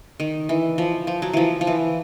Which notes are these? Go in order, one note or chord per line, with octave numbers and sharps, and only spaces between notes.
D#3
E3
F3
F3
F#3
E3 F3
F3
E3